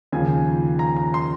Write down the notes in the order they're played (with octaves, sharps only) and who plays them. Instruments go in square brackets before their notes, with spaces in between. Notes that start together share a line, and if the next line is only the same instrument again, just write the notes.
[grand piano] D#2 C#3 F3 G#5
A#5
A#5
C6